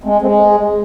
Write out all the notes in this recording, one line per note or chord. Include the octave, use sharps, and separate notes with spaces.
G#3 A3 C4
G#3 A3 C4